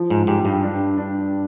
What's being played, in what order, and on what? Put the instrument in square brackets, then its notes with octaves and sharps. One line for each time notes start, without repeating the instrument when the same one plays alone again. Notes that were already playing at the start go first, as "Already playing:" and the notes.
Already playing: [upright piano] F3
[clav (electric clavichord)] G#2
[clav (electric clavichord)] G#2 [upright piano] G4
[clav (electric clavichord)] G2
[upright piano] D4
D4